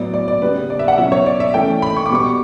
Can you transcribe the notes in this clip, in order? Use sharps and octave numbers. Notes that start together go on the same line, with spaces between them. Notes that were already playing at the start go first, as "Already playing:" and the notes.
Already playing: A2 F#3 B3 D5
D5
D5
C#3 G3 B3 B4
D5
E5
F#5
B2 F#3 C#4 E5
C#5
D5
E5
E3 A3 C#4 G5
B5
C#6
D6
B2 G3 B3 C#6